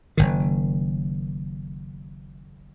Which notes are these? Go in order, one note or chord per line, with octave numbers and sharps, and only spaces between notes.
F#1 B1 D#3